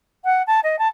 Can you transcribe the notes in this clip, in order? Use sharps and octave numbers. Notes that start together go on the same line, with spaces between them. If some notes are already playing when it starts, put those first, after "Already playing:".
F#5
A5
D#5
A5